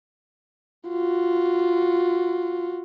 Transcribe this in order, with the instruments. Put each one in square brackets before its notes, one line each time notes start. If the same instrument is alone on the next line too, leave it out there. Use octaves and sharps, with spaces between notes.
[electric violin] F4 F#4